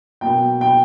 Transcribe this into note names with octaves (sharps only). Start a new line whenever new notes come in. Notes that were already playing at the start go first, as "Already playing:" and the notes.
B2 F#3 A#3 G5
G5